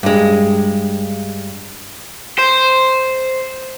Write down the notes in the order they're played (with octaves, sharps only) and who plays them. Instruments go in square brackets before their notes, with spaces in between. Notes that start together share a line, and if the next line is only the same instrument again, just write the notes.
[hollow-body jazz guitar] G2 G#3
[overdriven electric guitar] C5